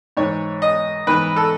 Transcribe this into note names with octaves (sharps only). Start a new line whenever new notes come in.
G#2 E3 C#5
D#5
G#2 E3 B4
A4